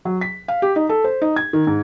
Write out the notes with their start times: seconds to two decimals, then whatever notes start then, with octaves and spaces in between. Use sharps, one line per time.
0.05 F#3
0.21 B6
0.48 F5
0.62 G4
0.76 D#4
0.89 A4
1.04 C5
1.22 D#4
1.36 G#6
1.53 D#3
1.67 G#2